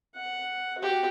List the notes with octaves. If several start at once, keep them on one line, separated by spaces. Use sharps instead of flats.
F#5
F#4 G4